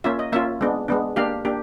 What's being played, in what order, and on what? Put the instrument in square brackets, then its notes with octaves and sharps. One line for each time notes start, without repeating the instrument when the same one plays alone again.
[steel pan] A#3 C#4 F4 E5
D#5
A#3 C#4 F4 E5
G#3 B3 D4
G#3 B3 D4
A#3 D4 G4 F5
A#3 D4 G4